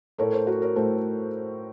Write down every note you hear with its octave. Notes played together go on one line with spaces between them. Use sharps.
A2 A3 A#4 C#5
A4 C5
F#4 A#4
A#4 C#5
A2 A3 A4 C5